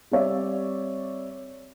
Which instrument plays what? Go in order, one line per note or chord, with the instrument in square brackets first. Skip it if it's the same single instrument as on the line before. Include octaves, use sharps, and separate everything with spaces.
[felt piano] G3 C4 C#5 D5 E5